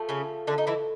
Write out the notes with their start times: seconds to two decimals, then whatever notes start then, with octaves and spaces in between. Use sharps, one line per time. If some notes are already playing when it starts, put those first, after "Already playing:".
Already playing: F3 A3
0.09 C#3 C#4
0.47 D3 D4
0.58 D#4
0.67 E3 E4